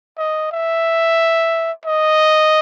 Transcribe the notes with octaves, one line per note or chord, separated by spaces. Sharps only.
D#5
E5
D#5